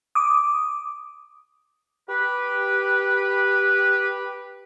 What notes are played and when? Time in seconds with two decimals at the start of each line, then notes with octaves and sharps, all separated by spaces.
0.15 D6 D#6
2.08 G4 B4